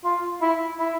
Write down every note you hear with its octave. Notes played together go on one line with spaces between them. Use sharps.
F4
E4
E4